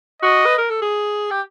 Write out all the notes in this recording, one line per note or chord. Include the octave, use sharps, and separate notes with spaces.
F#4 D#5
B4
A#4
A4
G#4
G4